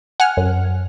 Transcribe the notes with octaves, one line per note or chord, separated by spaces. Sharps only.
F#5 G#5 F6
F#2